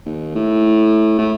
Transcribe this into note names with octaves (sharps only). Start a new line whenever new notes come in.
D#2
A2
A2